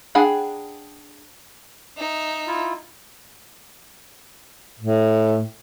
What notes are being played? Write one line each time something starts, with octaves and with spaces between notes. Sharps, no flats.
D4 G#4 F#5 G5 B5
D#4 E5
E4 F4
A2